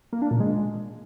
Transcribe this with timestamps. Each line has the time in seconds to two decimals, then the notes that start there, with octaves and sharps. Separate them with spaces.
0.13 A#3
0.22 D4
0.31 A#2
0.40 G#3